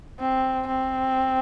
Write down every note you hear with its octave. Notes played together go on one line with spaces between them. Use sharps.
C4
C4